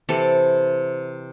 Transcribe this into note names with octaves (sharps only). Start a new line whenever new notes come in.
C3 E3 C4 A4